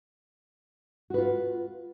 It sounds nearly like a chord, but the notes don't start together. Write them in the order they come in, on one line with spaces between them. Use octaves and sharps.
F#4 B4 F4